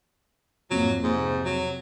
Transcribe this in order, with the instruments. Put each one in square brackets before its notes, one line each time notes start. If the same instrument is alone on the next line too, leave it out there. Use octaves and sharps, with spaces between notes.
[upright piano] F2 [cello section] G#2 A#3 [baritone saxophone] F#3
[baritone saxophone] G#2 [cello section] C3
[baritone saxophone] F#3